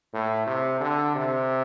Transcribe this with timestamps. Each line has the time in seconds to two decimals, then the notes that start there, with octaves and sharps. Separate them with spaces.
0.13 A2
0.47 C3
0.81 D3
1.15 C3